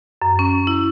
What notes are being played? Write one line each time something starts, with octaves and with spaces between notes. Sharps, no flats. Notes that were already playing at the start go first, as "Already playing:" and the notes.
F#2
C#4
E4